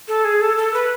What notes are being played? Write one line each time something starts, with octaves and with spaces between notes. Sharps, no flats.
A4
G#4
A4
A4
B4